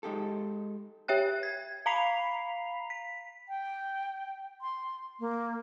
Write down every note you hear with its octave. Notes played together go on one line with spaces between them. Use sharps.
G#3 D#4 G4 A4
G4 C#5 E5 G5 F#6
G#6
F5 A#5 B5 B6 C7 F7
B6
G5
C6
A#3